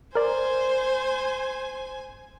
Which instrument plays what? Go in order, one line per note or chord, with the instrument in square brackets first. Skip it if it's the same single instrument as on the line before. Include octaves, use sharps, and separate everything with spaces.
[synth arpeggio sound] A#4 D5 [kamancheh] C5 [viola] G#5